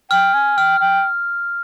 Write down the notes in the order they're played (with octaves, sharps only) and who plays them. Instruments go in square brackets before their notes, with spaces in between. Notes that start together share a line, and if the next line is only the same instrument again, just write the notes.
[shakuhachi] G5 [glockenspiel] F6
[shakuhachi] G#5
[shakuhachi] G5 [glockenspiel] F6
[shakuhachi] G5